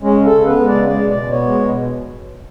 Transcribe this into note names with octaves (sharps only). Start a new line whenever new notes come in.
G#3 C#4
C#3
A4
C#3
B3 B4
G#3
D5
C#3
G#3 D5
B2
D5
B2
B3 C#5
G#3
B2